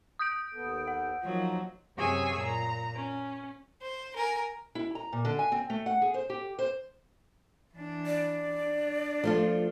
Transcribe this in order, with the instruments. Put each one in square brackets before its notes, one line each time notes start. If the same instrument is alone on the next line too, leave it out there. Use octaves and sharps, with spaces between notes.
[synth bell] D#6 G6 D7
[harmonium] D#2 B3 A4
[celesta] F#5
[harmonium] D#3 A#3 F4 [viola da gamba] F3 F#3
[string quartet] F#2 C3 G#4 C#5 G#5 E6
A#2 A#5
C#4
[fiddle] C5
A#4 G#5
[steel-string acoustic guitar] E4
A#5
A#2
D3
G#5
C4
A3
F#5
G#4
C5
G4
C5
[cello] E3 D4
[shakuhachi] D5
[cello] D4
[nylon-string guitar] F3 A3 F4